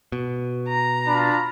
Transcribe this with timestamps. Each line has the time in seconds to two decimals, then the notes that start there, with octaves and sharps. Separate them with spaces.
0.12 B2
0.68 A#5
1.07 D4 F4 B5